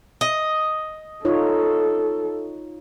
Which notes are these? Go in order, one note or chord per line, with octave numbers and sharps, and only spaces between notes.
D#5
D#4 F4 A4 C#5